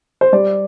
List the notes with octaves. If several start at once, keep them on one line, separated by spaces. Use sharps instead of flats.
C5
G3 D5